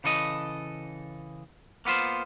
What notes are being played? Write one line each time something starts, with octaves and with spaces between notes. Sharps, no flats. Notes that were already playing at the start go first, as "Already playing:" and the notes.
C#3 E3 A4 D#5
A#3 B3 F4 C5